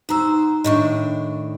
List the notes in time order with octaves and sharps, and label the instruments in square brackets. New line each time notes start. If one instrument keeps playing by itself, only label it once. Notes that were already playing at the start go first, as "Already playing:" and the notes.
[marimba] D#4 A#5 E6 [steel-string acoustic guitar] F#4 C5
[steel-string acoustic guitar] A2 D#3 D4 [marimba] D#5 C#6